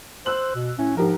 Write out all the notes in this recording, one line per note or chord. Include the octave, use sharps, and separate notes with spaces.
C5 E6 F#6 F#7
B2
A2 C#4
G#2 F3 G4 A#4